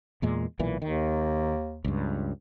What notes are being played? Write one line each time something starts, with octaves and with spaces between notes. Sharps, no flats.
E2 A#2 G#3
B1 A#2 E3
D#2 D#3
C#2 G2